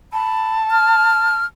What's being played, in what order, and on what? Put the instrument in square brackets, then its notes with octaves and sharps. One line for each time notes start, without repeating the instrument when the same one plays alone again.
[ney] A5 [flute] B5
[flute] F6